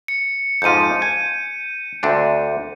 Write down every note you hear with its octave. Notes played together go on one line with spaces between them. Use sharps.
C#7
F2 G#2 F3 G6 D#7
G#5
D2 C4 D4